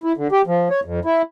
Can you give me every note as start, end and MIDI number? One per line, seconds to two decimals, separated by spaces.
0.04 0.12 64
0.17 0.28 50
0.32 0.42 67
0.47 0.68 53
0.70 0.80 73
0.85 1.00 41
1.05 1.22 64